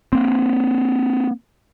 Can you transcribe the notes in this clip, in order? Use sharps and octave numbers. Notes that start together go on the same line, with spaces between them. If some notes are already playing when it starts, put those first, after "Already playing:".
A#3 C4